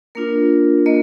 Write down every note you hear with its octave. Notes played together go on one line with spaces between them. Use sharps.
A#3 D4 F4 A#4
A#3 D#5